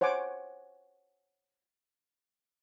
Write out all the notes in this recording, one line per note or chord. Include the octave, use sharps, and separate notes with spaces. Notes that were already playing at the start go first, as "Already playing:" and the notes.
C5 C#5 F#5 G#5 D6